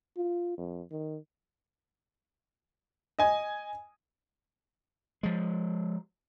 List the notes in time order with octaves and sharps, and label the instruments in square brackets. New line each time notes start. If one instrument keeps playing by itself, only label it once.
[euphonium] F4
F2
D#3
[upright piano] D#5 G#5
[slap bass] F3 G#3